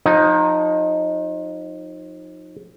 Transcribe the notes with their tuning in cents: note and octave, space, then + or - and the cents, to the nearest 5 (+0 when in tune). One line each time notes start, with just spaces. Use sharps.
F3 +35 D#4 +0